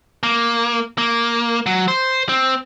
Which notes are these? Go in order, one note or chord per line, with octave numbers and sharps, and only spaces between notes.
A#3
A#3
F#3
C5
C4